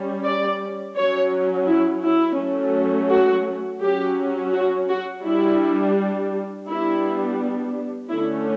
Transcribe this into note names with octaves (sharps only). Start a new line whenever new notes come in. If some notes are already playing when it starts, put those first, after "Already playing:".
Already playing: G3 C#4
D5
F#3 C#4 C#5
E4
E4
F#3 A3 C#4
F#4
F#3 C#4 G4
F#4
F#4
G3 D4 E4
G3 B3 D4 E4
D3 A3 C#4 E4